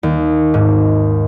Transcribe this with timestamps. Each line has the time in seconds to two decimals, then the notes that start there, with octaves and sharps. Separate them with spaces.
0.03 D#2
0.54 G#2